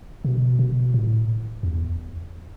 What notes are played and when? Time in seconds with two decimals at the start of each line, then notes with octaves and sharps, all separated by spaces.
0.25 B2
0.59 B2
0.94 A2
1.63 E2